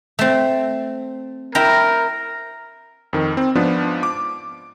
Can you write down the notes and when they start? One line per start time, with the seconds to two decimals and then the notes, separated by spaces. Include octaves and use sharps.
0.19 A3 C4
1.55 E4 A#4 G5 A#5
3.13 F2 D#3
3.37 C4
3.55 G#2 F3 B3 D4
4.03 D6